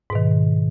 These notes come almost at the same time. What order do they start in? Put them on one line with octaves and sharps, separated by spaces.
G#2 B2 D#3